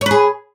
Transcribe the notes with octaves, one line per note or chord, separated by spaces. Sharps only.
G#4 B4 C#5